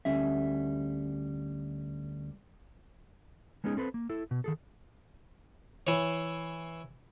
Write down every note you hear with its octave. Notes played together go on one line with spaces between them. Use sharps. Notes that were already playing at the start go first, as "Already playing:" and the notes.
D2 G3 C#4 E5
G#3 B3 C#4 D#4 G#4
C4 A4 B4 C5
A#3
E4 A4
B2
D#3 G#4 A4
E3 C#5